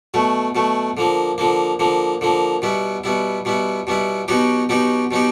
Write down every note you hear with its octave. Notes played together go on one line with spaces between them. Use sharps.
B2 F#3 A3
B2 F#3 A3
D3 F3 A#3
D3 F3 A#3
D3 F3 A#3
D3 F3 A#3
B2 G3 B3 E4
B2 G3 B3 E4
B2 G3 B3 E4
B2 G3 B3 E4
B2 F#3 B3 D#4 G4
B2 F#3 B3 D#4 G4
B2 F#3 B3 D#4 G4